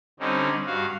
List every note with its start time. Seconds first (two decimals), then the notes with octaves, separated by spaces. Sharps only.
0.20 D3 G3 C4 C#4 D#4
0.66 G2 F#4 F5